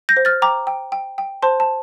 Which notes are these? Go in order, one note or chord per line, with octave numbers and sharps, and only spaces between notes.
G6 A#6
C5
F6 A6
G5 A#5 D6
G5
G5
G5
C5 A5 C6
A5